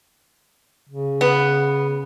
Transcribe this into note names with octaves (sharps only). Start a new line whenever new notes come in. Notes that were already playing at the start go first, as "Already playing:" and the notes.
C#3
B3